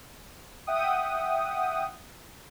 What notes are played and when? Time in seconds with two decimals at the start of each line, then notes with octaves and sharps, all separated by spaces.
0.67 E5 F#5 G5 D#6